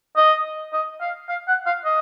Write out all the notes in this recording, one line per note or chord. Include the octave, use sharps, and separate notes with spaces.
D#5
D#5
F5
F5
F#5
F5
D#5